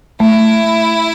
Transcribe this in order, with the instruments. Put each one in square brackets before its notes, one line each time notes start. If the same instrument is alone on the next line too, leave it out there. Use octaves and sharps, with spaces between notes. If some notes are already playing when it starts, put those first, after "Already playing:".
[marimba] A3 [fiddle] E4